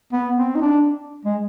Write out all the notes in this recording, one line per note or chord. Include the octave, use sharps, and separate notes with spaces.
B3
C4
D#4
D4
G#3